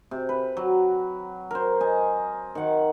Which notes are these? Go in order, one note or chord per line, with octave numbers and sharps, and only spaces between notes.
C3
B4
F#3
A#4 C5
D#5 G#5
D#3 F#5